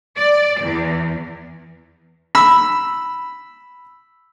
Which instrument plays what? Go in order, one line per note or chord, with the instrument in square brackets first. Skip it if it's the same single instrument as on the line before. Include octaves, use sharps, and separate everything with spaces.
[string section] D5
E2
[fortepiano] B5 E6